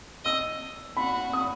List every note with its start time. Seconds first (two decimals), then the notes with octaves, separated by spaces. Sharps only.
0.25 D#5 E6
0.97 F#4 B5
1.33 D#6